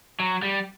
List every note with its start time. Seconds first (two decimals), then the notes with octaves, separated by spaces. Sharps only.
0.20 F#3
0.43 G3